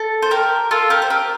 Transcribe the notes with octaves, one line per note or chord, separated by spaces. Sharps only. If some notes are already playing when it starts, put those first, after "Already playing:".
Already playing: A4
C5
G4 A#4
F4 A4
G4 A#4
C5
G4 A#4